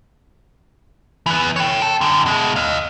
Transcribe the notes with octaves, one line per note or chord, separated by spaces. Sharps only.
E3 B3
C#5 G5
A4
F#2 D3
B2 G#3
D#5 F5